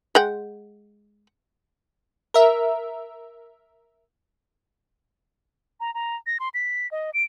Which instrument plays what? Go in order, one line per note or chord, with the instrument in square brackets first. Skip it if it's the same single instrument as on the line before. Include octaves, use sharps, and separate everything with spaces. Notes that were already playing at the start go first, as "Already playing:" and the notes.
[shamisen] G#3 F#5 G5
[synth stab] A#4 E5
[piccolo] A#5
A#5
A#6
C6
B6
D#5
D7